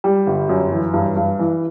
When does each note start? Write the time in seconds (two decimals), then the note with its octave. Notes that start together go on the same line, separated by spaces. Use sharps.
0.04 G3
0.27 G1
0.49 F#2
0.72 E3
0.94 G2
1.17 G2
1.39 E3